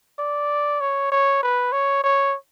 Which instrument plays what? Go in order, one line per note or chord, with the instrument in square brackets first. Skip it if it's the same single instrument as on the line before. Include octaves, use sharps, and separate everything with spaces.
[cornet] D5
C#5
C#5
B4
C#5
C#5